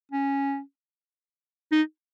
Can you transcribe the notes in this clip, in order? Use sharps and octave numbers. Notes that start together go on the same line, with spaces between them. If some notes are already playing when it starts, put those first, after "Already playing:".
C#4
D#4